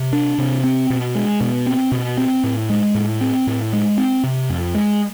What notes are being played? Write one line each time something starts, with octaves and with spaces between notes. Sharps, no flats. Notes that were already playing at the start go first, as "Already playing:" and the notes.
Already playing: C3
D4
C3
C4
B2
G#3
B2
C4
B2
C4
A2
G#3
A2
C4
A2
G#3
C4
C3
F2
G#3